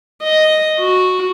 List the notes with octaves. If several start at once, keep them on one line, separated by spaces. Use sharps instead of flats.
D#5
F#4